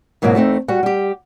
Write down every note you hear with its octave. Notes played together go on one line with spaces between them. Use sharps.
F2 G#2 B2 F#3 A#3 E4
E2 A3 C4 D#4
G3 F#4 F#5
G3 G4